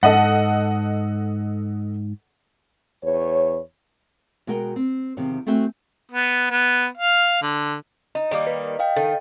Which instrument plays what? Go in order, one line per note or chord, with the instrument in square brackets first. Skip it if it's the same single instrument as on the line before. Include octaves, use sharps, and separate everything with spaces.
[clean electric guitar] G#2 [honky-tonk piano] A4 D#5 F#5
[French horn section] E2 B4 C#5
[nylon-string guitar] B2 G#3 F#4 A#4 D#5 G5
C4
E2 C3 D#3 F3
A3 C4 F#4 E5 G5 G#5
[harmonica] B3
B3
F5
D3
[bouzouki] D#4 [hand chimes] D#5
[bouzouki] D#3 G3 A#3 [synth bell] D5 D6
[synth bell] B4
[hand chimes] D#5 F5 G5
[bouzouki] D#3 [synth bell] A4